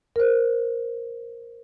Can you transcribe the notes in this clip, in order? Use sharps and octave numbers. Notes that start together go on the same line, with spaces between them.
A#4 C5